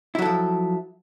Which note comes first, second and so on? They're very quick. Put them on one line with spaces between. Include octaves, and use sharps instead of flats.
E4 F#3 A4 F3